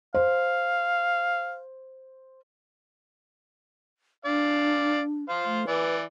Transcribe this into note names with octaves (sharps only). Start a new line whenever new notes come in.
C5 F5
D4 D5 F5
C5 F5
A3
E3 B4 D5